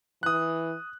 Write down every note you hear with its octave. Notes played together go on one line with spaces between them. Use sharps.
E3 D#6 F#6